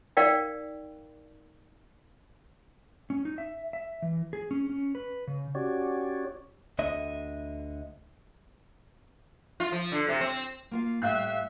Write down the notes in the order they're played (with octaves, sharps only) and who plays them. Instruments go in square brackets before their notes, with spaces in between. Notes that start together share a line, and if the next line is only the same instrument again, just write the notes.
[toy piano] D#4 A#4 D5 F5 G5
[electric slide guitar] C#4
D#4
E5
E5
E3
G#4
C#4
C#4
B4
C#3
[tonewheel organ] C#4 F#4 G4 C#5 D5
[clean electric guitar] D2 D3 D#5 E5
[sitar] F4
F3
D3
C3
C4
[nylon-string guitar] A#3 F4 F5
[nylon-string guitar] A2 G3 [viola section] E5 [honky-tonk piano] F5 F#6